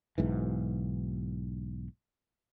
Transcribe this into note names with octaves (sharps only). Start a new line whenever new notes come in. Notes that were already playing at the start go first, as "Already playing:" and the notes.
B1 G#2 E3